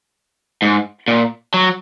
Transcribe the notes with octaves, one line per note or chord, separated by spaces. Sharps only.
G#2
A#2
F#3